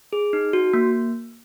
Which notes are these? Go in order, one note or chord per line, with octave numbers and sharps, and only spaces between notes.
G#4
D#4
F#4
A#3